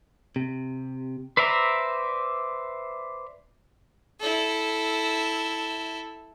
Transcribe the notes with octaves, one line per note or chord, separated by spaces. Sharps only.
C3
B4 C5 D5 E5 A#5
E4 A4